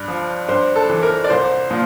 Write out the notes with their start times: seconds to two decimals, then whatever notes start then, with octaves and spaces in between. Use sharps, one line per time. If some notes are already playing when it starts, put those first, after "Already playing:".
Already playing: G2
0.08 F3
0.48 G2 C5
0.76 A4
0.89 E3
1.03 A#4
1.24 D5
1.30 C2 C5
1.71 A#2 F3